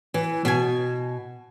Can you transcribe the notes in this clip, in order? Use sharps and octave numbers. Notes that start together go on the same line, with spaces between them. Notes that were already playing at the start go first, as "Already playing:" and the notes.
E3
B2 G#5